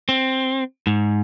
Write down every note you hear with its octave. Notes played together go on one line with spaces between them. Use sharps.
C4
G#2